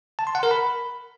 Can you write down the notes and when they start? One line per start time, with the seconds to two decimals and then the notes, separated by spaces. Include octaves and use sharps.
0.19 A5
0.27 C6
0.35 F#5
0.43 A#4
0.51 B5